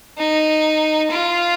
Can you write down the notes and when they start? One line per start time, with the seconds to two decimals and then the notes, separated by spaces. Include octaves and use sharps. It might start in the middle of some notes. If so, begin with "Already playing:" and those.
0.18 D#4
1.11 F4